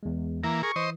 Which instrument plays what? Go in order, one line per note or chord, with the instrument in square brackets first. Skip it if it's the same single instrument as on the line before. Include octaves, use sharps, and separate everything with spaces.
[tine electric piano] E2 G#3
[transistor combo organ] E3 A#3 [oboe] A#5 [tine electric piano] A#6
[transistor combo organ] G#4 A#4 [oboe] C#6
[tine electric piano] E3 [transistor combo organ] C5 D#5